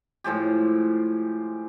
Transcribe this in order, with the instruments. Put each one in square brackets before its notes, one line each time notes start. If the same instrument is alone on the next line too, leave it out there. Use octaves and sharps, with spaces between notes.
[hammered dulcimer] A2 F3 G#3 G4